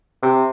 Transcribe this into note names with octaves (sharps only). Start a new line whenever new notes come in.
C3